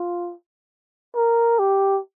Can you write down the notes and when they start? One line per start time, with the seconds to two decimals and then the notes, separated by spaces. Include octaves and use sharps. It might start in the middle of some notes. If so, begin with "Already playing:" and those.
Already playing: F4
1.16 A#4
1.59 G4